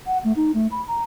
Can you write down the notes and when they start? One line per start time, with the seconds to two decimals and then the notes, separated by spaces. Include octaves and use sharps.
0.07 F#5
0.24 A3
0.36 D#4
0.54 A3
0.71 B5
0.88 A#5